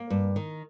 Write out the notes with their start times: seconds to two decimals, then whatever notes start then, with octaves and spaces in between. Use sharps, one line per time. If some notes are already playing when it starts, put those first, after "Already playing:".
Already playing: A#3
0.10 G2
0.36 D#3